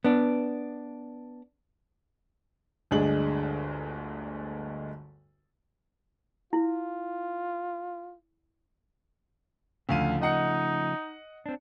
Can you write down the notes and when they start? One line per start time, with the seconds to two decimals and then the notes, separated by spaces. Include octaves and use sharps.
0.04 B3 D4
2.91 G1 D2 G#3 D4 G#4 F#7
6.53 E4 F4
9.89 D2 C#3 F3 A3 F5 D#7
10.22 D#4 D#5 F#5 C#7
11.46 C4 D4